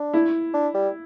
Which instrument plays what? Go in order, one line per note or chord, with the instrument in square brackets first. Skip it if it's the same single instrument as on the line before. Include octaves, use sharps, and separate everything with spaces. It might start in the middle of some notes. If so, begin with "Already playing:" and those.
Already playing: [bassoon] D4
[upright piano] E4
[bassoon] D4
G3